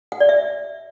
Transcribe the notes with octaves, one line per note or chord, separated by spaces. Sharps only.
F#5
D5
E5